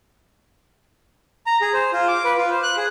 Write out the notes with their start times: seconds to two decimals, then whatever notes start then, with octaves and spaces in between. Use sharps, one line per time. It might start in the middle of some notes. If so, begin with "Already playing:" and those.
1.46 A#5
1.61 G#4
1.73 C5
1.93 F4
2.08 D6
2.24 B4
2.37 F4
2.50 C5
2.63 F#6
2.77 G#4